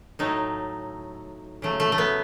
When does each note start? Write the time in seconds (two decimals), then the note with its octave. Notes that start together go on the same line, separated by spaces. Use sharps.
0.19 A2 F#3 A3 D#4
1.62 C#3 F#3 A3
1.80 A3
1.92 A3
1.98 B3